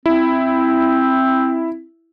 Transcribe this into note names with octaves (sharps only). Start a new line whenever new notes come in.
C4 E4